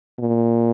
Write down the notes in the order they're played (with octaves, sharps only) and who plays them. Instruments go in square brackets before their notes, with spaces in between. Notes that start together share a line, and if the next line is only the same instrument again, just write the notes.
[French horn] A#2